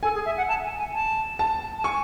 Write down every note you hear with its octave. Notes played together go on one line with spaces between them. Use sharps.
A4 G#5
G#4
E5
F#5
A5
G#5
G#5
A5
A5
A5
G#5 C#6